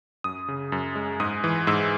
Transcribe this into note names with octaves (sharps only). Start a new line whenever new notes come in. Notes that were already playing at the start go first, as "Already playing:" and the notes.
F#2 D#6
C#3
F#2
G#3
G#2 D#6
E3
G#2 E6